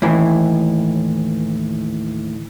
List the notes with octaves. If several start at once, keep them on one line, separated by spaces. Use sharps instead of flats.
D#2 A2 E3